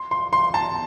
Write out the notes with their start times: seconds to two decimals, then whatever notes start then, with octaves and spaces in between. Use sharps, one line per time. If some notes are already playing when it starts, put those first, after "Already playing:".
Already playing: C6
0.11 C6
0.33 C6
0.54 A5